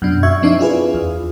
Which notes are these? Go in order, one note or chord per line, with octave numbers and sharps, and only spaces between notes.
F#2 B2 D4
F#4 E5 C#6 G#6
F3 C4 D4 D#4 D5 E5
E4 F4 G#4 B4
E2